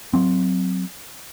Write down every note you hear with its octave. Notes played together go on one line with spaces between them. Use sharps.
F#3 C4